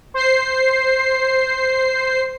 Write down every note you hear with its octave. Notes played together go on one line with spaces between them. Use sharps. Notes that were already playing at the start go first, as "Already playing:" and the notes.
C5 C7